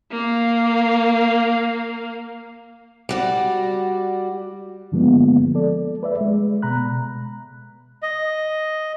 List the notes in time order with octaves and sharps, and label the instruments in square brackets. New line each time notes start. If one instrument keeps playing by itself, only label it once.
[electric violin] A#3 F5
[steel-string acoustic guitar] G3 F#4 D5
[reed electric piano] G2 D3 F3 G#3 A#3 B3
A4 D5
B4 D5 E5
G#3
B2 A#5 B5 F#6
[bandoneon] D#5